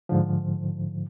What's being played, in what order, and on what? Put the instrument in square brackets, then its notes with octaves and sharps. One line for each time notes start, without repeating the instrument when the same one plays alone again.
[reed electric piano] G#2 D3 F3